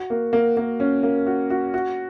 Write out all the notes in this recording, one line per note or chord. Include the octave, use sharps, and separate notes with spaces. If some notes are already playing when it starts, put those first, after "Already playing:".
Already playing: F#4
A#3
A#3
A#3
C#4
A#3
F#4
F#4
F#4